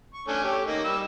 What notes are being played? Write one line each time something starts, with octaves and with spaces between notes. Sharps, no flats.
C#6
A3 C#4 D4
G4 C#5
A#3 D#4
G3 E6